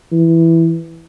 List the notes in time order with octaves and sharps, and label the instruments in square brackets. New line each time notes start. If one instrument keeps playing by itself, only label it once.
[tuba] E3